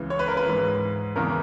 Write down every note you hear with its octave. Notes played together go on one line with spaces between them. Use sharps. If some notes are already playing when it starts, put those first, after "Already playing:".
Already playing: C#2 C#3 E3
C#5
B4
A#4
B4
G#2 E3
E2 C#3 E3 A#4